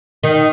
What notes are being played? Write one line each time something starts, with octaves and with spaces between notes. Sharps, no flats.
D#3